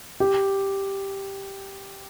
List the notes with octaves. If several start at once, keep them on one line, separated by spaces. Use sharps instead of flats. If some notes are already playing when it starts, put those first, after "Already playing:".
G4